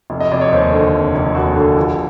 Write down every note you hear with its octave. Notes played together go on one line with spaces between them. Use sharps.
F1
D#5
F1 D5
C#5
D#2 C5
D3
F1
F1
D#2 F#4
D3
A#1